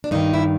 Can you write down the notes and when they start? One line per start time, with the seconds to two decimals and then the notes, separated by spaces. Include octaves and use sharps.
0.04 D4
0.11 G2 D#3 D#4
0.34 E4